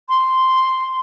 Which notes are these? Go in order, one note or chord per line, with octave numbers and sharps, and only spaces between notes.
C6